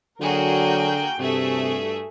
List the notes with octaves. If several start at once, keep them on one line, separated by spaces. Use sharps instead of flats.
D3 F#3 A#3 F#4 G#4 A#4 G5
G2 C3 A3 F#4 G#4 A4 E5